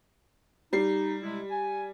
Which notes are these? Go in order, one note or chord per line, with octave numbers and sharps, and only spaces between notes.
G3 D#4 C7
C3 G#3 E4
G#5